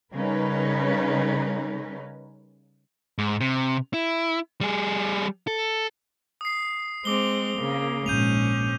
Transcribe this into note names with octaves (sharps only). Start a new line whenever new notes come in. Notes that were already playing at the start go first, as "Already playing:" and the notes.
C#3 G3 C#4 D#4 A#4 B4
G#2
C3
E4
G3 G#4
A4
D#6 C7
G#3 C4 D6 G7
C#3 A#3
A#1 G#2 C#4 G6 D#7 F7